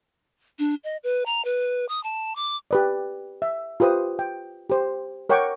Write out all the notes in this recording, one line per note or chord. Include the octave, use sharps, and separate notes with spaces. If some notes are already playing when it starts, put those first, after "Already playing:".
D4
D#5
B4
A#5
B4
D#6
A5
D6
G4 B4 D5
E5
F4 G4 B4 C5 D#6
G5
G4 C5
A#4 C#5 F#5 G5 C#6 D6